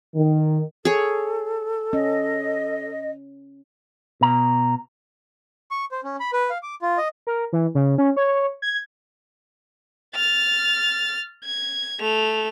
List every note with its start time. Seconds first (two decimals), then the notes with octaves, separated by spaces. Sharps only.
0.15 D#3
0.85 G#4 A4 C#5
1.93 C#4 D#5
4.21 B2 A#5
5.71 C#6
5.92 C5
6.04 C#4
6.20 B5
6.33 B4
6.50 F5
6.63 D6
6.82 F4
6.98 D#5
7.27 A#4
7.53 E3
7.75 C#3
7.98 C#4
8.17 C#5
8.62 G#6
10.15 F6 A6
11.44 G#6
12.00 A3 F7